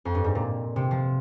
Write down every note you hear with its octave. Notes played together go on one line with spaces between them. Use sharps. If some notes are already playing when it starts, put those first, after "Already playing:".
F2
G2
G#2
A#2
C3
F3